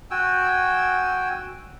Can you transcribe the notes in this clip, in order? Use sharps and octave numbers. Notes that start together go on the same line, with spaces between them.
F#4 G5 G#5 E6